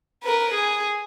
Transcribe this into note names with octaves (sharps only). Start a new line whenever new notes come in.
A#4 B4
G#4